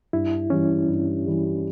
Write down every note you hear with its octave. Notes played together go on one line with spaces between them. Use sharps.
G2 E4
E3 G3 C#4
G2
E3 G3